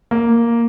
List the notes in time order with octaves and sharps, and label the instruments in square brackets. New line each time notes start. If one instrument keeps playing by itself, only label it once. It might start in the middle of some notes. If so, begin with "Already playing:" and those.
[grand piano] A#3